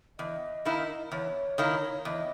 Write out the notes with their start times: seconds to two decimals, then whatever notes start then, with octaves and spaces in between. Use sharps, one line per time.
0.18 E2 D#5
0.65 D#3 A#3 E4
1.11 E2 C#5
1.58 D#3 A#3 E4
2.05 E2 D#5